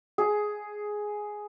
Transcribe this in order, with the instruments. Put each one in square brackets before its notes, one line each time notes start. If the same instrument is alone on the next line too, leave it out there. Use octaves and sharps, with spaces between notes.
[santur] G#4